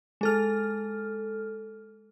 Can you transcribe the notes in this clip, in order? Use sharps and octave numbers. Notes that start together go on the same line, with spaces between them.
G#3 A4 F6